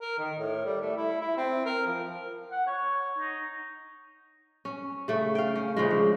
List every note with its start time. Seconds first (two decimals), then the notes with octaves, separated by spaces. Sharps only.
0.01 A#4
0.18 D#3
0.38 A2
0.65 G3
0.81 A3
0.97 E4
1.21 E4
1.37 C4
1.65 A#4
1.87 F3
2.51 F#5
2.67 C#5
3.18 D#4
4.65 C#4
5.08 C#3 A3
5.35 F5 G5
5.56 C#4
5.77 C#3 F3 G#3
5.90 D4